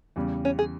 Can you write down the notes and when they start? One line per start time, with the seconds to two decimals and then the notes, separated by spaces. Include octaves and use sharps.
0.16 E2 C#3 G3
0.45 C#4
0.59 G#4